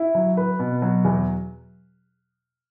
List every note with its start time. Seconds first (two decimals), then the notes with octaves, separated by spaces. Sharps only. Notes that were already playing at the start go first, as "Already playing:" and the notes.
Already playing: E4
0.15 F#3
0.37 B4
0.59 B2
0.82 F#3
1.05 E2